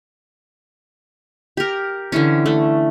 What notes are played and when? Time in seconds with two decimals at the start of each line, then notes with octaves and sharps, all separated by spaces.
1.57 G4 A#4
2.12 D3 E3 C#4
2.46 A3